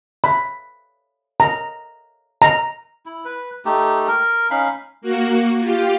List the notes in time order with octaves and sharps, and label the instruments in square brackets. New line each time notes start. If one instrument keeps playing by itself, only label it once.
[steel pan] B5
A#5
A#5
[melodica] E4
B4
A3 D#4 G4
A#4
C#4 D#4 F5 B5
[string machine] A#3 F#4
F4 G4